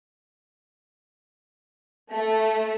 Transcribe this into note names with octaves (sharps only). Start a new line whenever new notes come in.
A3